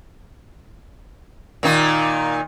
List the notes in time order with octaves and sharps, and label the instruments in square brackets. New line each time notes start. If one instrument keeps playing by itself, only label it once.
[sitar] A#2 D#3 D#4